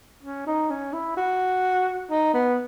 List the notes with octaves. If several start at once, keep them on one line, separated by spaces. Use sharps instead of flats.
C#4
D#4
C#4
E4
F#4
D#4
B3